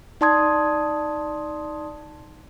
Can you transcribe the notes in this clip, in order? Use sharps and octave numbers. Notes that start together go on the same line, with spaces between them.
D#4 D5 A5 C6 D#6 G#6